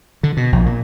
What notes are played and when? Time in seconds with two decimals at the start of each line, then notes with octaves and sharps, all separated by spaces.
0.23 D3
0.37 B2
0.52 A#1
0.66 A#2